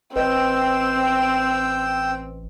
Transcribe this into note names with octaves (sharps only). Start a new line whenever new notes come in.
A1 C4 B4 D#5 G5 E6